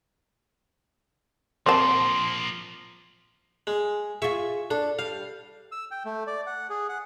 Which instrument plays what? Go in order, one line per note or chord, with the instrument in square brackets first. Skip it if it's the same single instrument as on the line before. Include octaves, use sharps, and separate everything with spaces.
[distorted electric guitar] F3 A#3 [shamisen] C4 A#4 A5 [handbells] C6
[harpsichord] G#3
[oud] F4 G#4 [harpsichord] E5 C#6
[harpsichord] D4 [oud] A4
[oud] G3 [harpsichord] F5
[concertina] E6
G5
A3
D5
F#5
G#4
F#5